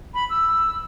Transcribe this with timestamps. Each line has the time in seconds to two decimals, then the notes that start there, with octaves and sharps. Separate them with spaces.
0.14 B5
0.30 E6